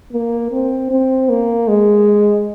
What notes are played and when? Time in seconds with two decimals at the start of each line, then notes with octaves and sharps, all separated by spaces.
0.12 A#3
0.51 C4
0.91 C4
1.29 A#3
1.68 G#3